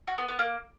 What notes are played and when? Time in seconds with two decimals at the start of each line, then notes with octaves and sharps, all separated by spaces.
0.07 F#4
0.18 B3
0.28 B3
0.39 A#3